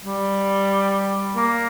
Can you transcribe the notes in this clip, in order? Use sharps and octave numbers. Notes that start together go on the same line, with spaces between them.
G3
A#3